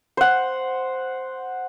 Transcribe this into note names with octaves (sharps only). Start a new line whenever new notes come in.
C5 F#5